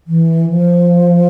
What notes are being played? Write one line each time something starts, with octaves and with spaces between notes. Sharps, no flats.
E3
F3